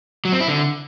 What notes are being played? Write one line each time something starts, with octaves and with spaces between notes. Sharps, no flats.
F#3
C4
E4
D3